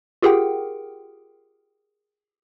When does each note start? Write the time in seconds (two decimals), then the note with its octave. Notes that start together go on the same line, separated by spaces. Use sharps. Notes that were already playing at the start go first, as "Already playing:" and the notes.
0.22 F4 G4 G#4 A#4 F#5 G5